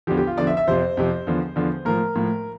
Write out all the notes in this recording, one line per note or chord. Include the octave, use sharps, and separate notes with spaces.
E2 D3 F3 G4
G4
F4
E2 D3 F3 D5
E5
E5
F2 C3 F3 C5
F2 C3 F3
E2 D3 F3
E2 D3 F3
A2 F3 A#4
A2 F3